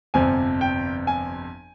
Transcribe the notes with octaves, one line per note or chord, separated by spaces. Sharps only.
G1 F2 C3 F3 G#5
G5
G#5